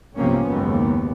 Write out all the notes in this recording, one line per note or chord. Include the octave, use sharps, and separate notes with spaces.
B1 G2 C3 F3 A#3 C#4
F#1 D#2 G#2 B3